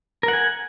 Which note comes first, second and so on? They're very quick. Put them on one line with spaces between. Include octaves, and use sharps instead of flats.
A#4 F#5 G#5